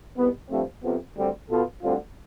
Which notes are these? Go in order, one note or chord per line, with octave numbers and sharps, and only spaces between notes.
C2 B2 B3
G2 F3 A3 C4
F2 C3 F3 B3
D2 D3 G3 C4
B2 B3 F4 A4
D2 D3 G3 C4 F4